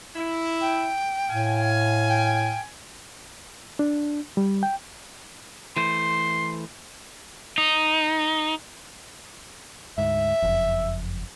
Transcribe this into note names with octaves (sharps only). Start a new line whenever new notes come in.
E4
G5
A2 F5 G#5
G5
D4
G3
G5
E3 A3 C5 C6
D#4
D2 G#2 E5
F#1 F2